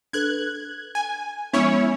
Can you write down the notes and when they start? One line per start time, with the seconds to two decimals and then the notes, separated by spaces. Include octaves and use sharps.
0.13 D4 A4 B4 F#6 G#6
0.95 G#5
1.53 F3 G#3 B3 C#4 E4 C#5